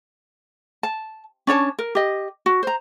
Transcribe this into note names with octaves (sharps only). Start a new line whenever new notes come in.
A5
C#4 D4 C#5 A5
A#4
G4 D#5
F#4
C5 A#5